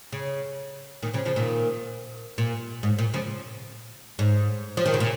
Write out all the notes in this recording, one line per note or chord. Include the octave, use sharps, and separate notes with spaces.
C#3
A#2 D#3
C#3 F3
C#3 F3
A#2 D#3
A#2
G#2
A#2
C#3 F3
G#2
F3
D#3
C#3
A#2